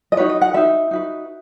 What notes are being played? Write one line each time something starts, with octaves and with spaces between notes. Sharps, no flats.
D#5
D#4 F#4 B4 C#5
D#5
F#5
D#4 F#4 B4 E5
D#4 F#4 B4